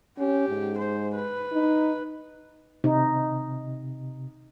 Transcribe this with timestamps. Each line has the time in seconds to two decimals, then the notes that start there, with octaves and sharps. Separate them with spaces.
0.19 C#4 G4
0.49 G#2
0.78 C5
1.15 B4
1.53 D#4
2.84 C3 D#4